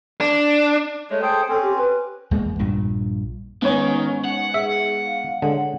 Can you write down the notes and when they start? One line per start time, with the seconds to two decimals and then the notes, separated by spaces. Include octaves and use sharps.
0.21 D4
1.10 G#3 A3 C#5
1.22 G#4 A4 C5 G5
1.49 C4 C#4 A4
1.62 G4
1.77 B4
2.31 E2 G#3 A#3
2.59 A#1 G2 A#2
3.62 G#2 D#3 B3 C#4 C#5 G#5
4.25 F#5
4.54 G#4 E5
5.05 F5
5.42 D3 G#3 C#5 F#5